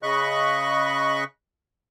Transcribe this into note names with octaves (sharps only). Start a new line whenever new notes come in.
C#3 D#5 B5 C#6 F#6